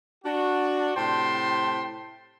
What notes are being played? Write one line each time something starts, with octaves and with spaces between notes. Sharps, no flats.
D4 F#4
A2 C3 C5 G5 A5 C6